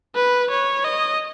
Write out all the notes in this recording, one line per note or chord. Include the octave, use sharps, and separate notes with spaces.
B4
C#5
D#5